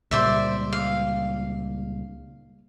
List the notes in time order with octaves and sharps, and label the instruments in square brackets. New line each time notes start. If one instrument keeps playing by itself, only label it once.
[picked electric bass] C#2 A#2 G3 [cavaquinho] C5 D5 E5
[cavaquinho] F5